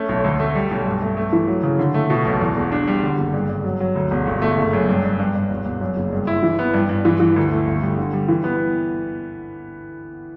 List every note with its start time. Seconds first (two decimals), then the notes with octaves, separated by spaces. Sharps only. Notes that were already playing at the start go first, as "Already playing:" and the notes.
Already playing: A3 C#4
0.09 B1
0.24 D2
0.40 A3
0.55 G3
0.71 B1
0.86 G2
1.02 A3
1.17 A3
1.33 E3
1.48 F#3
1.63 C#3
1.79 D3
1.94 A3
2.10 B2
2.25 B1
2.41 E2
2.56 E1
2.72 D4
2.87 G3
3.03 D3
3.18 F#1
3.34 G2
3.49 G2
3.64 F#3
3.80 F#3
3.95 D2
4.11 E1
4.27 G1
4.42 A3
4.58 F#1
4.73 F#2
4.89 G2
5.04 G2
5.19 G2
5.35 G2
5.50 E1
5.65 E1
5.81 F#2
5.97 F#1
6.12 G2
6.27 E4
6.43 E3
6.59 B3
6.74 G2
6.89 G2
7.05 E3
7.20 E3
7.36 D2
7.52 A3
7.67 G1
7.82 G3
7.98 D3
8.13 G3
8.29 E3
8.44 B3